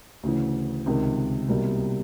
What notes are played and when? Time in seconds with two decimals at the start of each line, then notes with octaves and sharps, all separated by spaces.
0.23 D2 C#3 E3
0.86 C#2 C3 D#3
1.48 C2 B2 G3 A#3